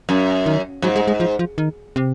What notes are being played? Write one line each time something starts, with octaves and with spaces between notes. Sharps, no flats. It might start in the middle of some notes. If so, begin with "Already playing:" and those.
F#2
D#3
G#2 F#3
G#3
G#3
F3
F3
D#3
C3